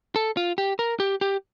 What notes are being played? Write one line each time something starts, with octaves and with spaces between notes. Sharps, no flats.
A4
F4
G4
A#4
G4
G4